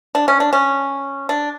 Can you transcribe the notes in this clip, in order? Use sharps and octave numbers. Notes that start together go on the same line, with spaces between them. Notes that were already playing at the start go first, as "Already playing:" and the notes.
D4
C#4
D4
C#4
D4